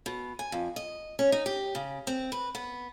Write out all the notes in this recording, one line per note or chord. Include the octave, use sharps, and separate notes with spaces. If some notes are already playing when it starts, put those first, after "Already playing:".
B2
G#5
F2
D#5
C#4
D#4
G4
C#3
C4
B4
B3